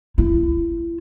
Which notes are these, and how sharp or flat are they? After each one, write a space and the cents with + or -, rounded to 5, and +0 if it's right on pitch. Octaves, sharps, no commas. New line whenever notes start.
E4 +35